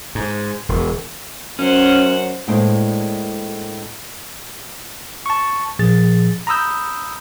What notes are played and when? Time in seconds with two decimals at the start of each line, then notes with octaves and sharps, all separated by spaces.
0.15 G#2
0.69 E1
1.59 F#2 C#4 C5 F#5
2.48 A2 G#3 A#3 D4 C5 D5
5.26 A5 C#6
5.79 A#2 F3 G#4 A6
6.47 A#5 B5 D#6 E6 G6